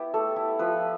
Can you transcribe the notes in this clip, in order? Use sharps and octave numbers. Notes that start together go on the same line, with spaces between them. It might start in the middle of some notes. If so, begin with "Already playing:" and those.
Already playing: B3 E4 G4
A3 A4
E4
F3 B4